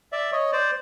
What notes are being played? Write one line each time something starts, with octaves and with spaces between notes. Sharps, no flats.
D5 E5
C#5 D#5
C5 D5